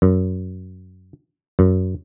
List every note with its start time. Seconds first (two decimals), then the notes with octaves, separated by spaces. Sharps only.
0.02 F#2
1.59 F#2